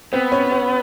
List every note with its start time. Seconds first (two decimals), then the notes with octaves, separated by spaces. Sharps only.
0.13 B3 C4
0.32 C#4
0.51 C#4